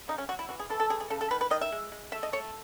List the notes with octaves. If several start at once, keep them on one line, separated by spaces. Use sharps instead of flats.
C#3 D#4
C#4
F#3 F#4
E4
E3 F#4
G#4
E3 A4
A4
E3 G#4
G#4
C#3 A4
A4
D#3 B4
B4
D#3 D#5
E5
G#3
G#3
A3 E5
D#5
A3 C#5